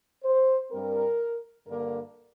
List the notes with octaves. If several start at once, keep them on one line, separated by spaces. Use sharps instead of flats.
C5
G2 G3 C4 A#4
G2 D3 A#3 A#4